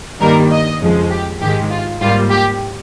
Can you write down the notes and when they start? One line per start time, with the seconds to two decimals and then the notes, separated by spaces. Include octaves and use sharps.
0.20 G2 D#3 G3 A#3 A#4
0.51 D#5
0.80 F2 C#3 F3 G#3
1.11 G4
1.41 G#2 D#3 G#3 G4
1.70 F4
2.01 G#2 G3 A#3 F4
2.30 G4